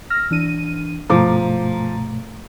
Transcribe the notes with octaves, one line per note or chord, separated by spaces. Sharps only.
E6 F6 A#6
E3 D4 D#7
G2 B2 F3 A3 A#5 D6